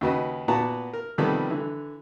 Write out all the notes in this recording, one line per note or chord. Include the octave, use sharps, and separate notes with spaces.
D#2 C#3 F#4 B4 D#5
A#2 B3 F#4 F#5 A5 A#5
A#4
C3 D#3 F3 G3 B3 A4
D3 E3